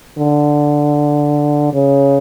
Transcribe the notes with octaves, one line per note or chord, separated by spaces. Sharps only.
D3
C#3